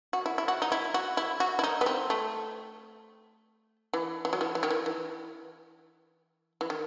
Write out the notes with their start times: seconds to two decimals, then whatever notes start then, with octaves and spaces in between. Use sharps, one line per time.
0.13 F#4
0.26 E4
0.38 E4
0.48 F#4
0.62 D#4
0.72 E4
0.94 F#4
1.17 E4
1.40 F#4
1.59 E4
1.64 D#4
1.81 B3
1.86 C4
2.10 A3
3.94 E3
4.25 E3
4.33 F#3
4.41 E3
4.55 E3
4.63 D#3
4.70 E3
4.86 E3
6.61 E3
6.70 D#3